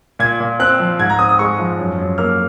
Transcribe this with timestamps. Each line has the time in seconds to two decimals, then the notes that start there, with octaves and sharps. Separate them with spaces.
0.19 A#2 G#6
0.40 A#2
0.60 C4 F#6
0.79 F3
0.99 G#2 G#6
1.10 A#5
1.19 C4 D#6
1.29 D#6
1.39 G#3 C#6
1.59 F3
1.78 F#2
1.98 F#2
2.18 A#3 F6